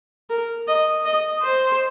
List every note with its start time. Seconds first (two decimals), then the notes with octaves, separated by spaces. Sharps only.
0.30 A#4
0.67 D#5
1.05 D#5
1.42 C5